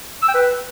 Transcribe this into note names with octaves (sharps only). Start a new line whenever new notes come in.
E6
G5
B4